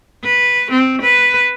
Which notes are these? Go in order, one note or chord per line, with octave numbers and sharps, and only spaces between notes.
B4
C4
B4